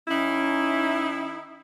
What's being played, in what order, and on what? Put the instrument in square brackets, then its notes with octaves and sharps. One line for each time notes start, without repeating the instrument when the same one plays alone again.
[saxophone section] D#3 D#4 E4 [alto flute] C#4